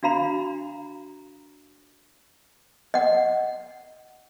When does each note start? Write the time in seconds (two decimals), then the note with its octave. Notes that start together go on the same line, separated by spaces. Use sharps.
0.03 D4 F#4 F5 A#5 B5
2.94 D#5 F#5